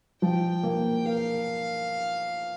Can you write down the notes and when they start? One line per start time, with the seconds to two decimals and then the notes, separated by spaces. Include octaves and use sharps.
0.22 F3 G5
0.63 A#3
1.05 A#4 F5